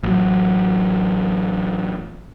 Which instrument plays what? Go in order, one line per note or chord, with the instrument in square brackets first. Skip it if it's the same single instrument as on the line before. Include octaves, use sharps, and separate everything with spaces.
[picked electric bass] A1 F#3